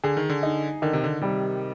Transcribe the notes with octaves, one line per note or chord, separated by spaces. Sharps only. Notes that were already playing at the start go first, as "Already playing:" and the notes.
D3 G#4
D#3
D3
D#4
D3 D#3
C3
D3
C3 G3